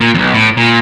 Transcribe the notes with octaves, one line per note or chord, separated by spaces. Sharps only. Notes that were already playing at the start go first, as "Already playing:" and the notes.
A#2
B1 E2
A2
A#2